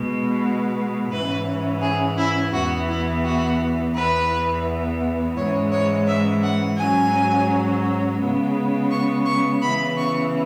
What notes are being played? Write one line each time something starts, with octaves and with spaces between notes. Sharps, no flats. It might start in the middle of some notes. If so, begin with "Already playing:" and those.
Already playing: B2 G#3 B3
G#2 E3 C#4 B4
G#4
E4
E2 E3 B3 F#4
E4
F#4
E2 E3 B3 B4
G#2 E3 G#3 C#4 C#5
C#5
E5
F#5
G#2 F#3 C#4 G#5
C#3 G#3 B3
C#6
C#6
C#3 E3 B3 B5
C#6